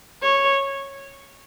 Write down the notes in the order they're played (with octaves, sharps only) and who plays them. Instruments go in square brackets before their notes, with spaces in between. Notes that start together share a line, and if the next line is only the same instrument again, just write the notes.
[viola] C#5